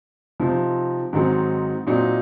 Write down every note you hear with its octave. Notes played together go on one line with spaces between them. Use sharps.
C3 F3 C4 D#4
G#2 D#3 F#3 C4 D#4
A#2 F#3 C4 D#4